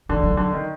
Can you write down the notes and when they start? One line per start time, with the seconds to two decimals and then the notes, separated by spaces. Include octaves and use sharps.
0.09 D3 E3
0.23 F#3
0.37 D3
0.53 D#3